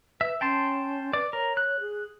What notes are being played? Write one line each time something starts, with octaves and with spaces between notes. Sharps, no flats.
B4 E5
C#4 G5 A5 C6
B4 D5
A#4 C#5
F#6
G#4